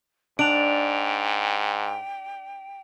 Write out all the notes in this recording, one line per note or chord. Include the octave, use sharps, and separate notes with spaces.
G#2 D4 G5 D7 F7